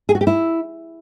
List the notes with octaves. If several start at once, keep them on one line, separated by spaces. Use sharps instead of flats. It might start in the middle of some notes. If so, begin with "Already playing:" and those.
G#4
F#4
G4
E4